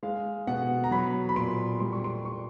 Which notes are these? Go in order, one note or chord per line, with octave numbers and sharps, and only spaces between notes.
G#3 F5
B2 F#5
A#5
F#3 B5
B5
A#2 C6
G3 C6
C#6
C6
A#2 C#6